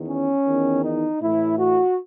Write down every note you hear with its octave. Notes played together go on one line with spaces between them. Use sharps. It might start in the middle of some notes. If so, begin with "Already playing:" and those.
Already playing: E2 D#3
C#4
E2 D#3
D#4
A2 E3 E4
F#4